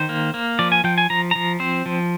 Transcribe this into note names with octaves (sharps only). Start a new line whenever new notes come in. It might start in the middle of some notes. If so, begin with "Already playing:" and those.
Already playing: D#3 C5
A#3
A#3
F3 D5
G#5
F3 G5
G#5
F3 A#5
F3 A#5
C4 C5
F3